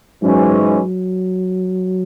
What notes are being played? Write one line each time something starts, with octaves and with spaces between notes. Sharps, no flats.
G#2 E3 F#3 G#3 C#4
F#3